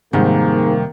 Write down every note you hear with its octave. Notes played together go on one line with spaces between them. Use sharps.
F1 G#2 C3 D#3 G3 A#3